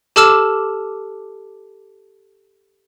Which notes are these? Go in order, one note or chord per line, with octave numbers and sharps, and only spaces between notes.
G4 A4 A5 D6 E6 F6